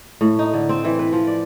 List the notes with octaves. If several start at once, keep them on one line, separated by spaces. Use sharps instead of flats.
A2
D#4
D3
C4
E3
B4
F3
D5